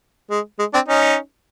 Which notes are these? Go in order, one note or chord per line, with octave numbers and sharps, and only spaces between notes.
G#3
G#3
C4 D4
C#4 D#4